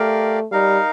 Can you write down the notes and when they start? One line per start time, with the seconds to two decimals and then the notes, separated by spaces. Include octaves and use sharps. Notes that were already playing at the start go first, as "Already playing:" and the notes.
Already playing: A3 G4 A#4 D5 F5
0.51 G3 D#4 A#4 F5